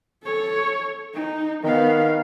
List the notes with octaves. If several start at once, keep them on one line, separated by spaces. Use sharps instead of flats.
A4 C#5
D#4
D#3 B3 F5